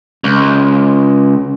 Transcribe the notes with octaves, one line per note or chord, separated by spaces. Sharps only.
C#2